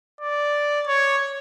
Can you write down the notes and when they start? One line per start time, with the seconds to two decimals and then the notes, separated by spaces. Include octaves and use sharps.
0.21 D5
0.87 C#5